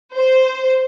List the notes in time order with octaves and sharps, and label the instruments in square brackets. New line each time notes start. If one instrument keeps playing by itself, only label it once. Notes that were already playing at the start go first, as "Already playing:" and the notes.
[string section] C5